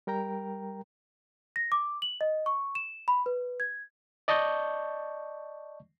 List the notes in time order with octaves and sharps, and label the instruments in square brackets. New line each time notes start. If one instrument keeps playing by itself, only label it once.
[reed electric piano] G3 A#4 G5 A#5
[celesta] A#6
D6
F#7
D#5
C#6
E7
B5
B4
G#6
[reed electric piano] D5 D#5 A5 C#6 G6